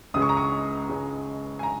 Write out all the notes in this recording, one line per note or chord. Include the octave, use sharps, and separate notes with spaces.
C#2 C#3 G#3 D#6
C#6
A#5
C#6
C#2 C#3 G#3
G#5
A#5